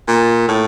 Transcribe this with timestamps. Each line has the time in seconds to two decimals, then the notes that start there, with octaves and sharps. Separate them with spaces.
0.08 A#2
0.48 A2